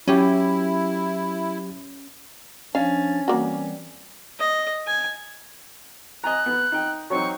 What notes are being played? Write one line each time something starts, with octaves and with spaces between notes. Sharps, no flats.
F#3 C#4 E4 G4
F3 C#4 D4 F5 A6
E3 G3 A#3 C4 F#4
D#5
G#5
D#5 G#5 A#5 F#6
B3
D#4 G5
F#3 C4 D#4 C#6